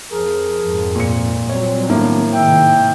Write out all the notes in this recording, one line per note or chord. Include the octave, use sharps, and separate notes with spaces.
F2 F3 G#4 A#4
F2 G#2
A#2 C#7
A#2 F#3 G3 C4 C#5
A2 D#3 A#3 B3 D4
G#2 C3 D#3 E5 G5